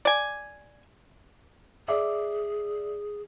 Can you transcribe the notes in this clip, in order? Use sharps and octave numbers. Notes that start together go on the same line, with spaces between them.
D5 G#5
G#4 D5 E5 D6